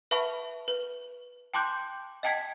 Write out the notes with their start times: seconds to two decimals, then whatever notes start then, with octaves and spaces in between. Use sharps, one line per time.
0.11 B4 E5 F#5 A5 B5 C#6
0.68 B4
1.54 G5 A5 C6 D6 F#6 G6
2.23 D#5 F#5 G5 A5 G#6 B6